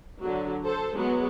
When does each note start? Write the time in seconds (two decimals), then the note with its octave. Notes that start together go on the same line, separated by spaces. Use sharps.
0.21 D3 F#3
0.65 A4 C5
0.95 F#3 G#3 B3